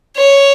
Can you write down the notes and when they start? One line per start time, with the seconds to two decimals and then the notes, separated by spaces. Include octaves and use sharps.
0.17 C#5